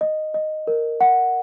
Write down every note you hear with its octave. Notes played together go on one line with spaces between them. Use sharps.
D#5
D#5
A#4
F#5